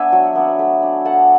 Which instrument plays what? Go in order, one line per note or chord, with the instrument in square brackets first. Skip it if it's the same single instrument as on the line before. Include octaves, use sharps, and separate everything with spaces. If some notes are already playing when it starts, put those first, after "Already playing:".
Already playing: [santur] B3 D4 E5 F#5 G#5
F#3
B3 D4
A3
D4
A3 F#5 A5